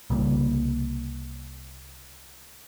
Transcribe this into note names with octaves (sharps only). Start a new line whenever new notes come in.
C2 C#3 G3 A#3